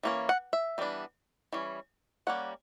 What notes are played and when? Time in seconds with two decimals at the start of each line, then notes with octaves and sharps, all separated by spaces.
0.03 E3 A#3 C#4
0.29 F#5
0.53 E5
0.78 E3 G3 B3 D4
1.53 E3 G3 C#4
2.27 G3 A#3 C#4 F#5